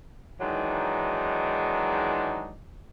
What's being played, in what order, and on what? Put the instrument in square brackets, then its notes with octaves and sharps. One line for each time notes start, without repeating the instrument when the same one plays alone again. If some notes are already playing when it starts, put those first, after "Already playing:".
[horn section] D#3 E3 F#3 G#3 D4 D#4